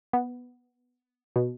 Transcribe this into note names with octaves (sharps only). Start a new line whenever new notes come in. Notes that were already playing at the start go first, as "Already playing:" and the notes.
B3
B2